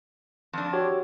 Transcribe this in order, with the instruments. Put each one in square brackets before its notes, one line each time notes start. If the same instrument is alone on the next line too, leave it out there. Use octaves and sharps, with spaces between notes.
[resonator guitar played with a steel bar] F2 D4
[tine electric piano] F#4 G4 C#5